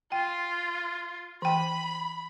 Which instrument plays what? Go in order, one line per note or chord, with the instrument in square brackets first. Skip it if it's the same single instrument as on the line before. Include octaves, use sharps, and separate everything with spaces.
[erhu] F4 [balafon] G5
[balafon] E3 G5 [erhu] B5